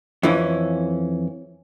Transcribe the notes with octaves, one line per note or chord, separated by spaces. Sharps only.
F2 E3 C#4